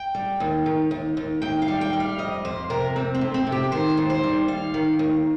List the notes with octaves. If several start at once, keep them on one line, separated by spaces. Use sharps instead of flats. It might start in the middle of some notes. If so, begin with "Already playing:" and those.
Already playing: G5
G3
D#2
D#3
D#2
D#2
D#2 G5
F5
G3
G5
G3
F5
F2 D#5
F2 C5
C3 A#4
F2 C4
C4
F2
C4
C3
G4
D#3 C5
D#2
C5
G3
D#2 F5
D#3
D#2